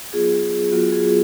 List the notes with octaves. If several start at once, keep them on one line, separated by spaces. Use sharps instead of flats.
F#3 B3 F4 G#4
F#3 B3 F4 F#4
G#4